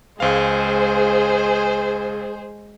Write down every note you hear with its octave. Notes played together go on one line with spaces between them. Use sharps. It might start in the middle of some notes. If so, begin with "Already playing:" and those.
C#2 G#3 G#4 C5 F5